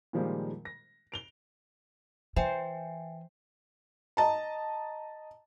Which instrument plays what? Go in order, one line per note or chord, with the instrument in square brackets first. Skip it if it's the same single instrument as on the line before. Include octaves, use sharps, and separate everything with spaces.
[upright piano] A#2 D#3 F3 G3 G#3 A#3
A#6
D7 F7 G7
[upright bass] E3 [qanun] C5 [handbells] E5 G5 G#5
[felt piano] D#5 A5 A#5